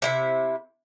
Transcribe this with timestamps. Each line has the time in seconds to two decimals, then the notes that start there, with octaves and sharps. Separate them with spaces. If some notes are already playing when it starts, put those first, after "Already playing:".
0.02 C3 E4 E5